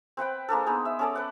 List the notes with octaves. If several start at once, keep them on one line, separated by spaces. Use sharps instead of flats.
C4 B4 F#5 G5
G#3 A#3 D4 A4
B3 D#4 G#4
E5
C#4 A4 D5
B4 F#5